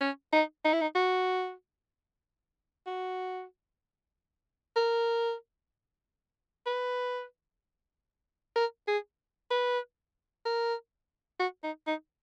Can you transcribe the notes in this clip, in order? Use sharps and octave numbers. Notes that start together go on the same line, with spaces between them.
C#4
D#4
D#4
E4
D#4
F#4
F#4
A#4
B4
A#4
G#4
B4
A#4
F#4
D#4
D#4